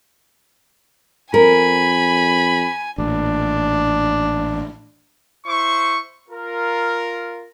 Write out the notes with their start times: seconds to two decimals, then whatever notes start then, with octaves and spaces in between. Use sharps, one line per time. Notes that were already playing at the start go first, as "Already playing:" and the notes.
1.34 F2 A#4 G#5 B5
2.98 A1 A#2 D4
5.46 E4 C5 C#6
6.29 F4 A#4